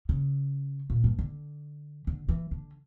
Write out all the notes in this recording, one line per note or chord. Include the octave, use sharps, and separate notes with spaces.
C#3
A#2
G2
D3
D3
E3
D3